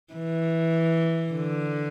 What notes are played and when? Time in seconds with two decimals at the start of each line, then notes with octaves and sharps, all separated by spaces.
0.13 E3
1.32 D3